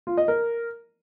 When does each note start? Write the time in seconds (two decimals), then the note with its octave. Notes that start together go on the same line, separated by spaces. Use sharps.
0.07 F4
0.17 D#5
0.28 A#4